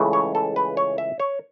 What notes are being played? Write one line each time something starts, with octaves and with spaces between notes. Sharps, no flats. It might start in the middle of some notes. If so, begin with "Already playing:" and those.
Already playing: C#2 C#3 E3 A3
C#5
A4
B4
C#5
E5
C#5